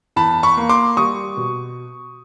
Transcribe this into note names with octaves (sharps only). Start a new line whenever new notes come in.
E2 A5 B5
B5 C#6
A#3
C6 D6
G3 C#6 D#6
B2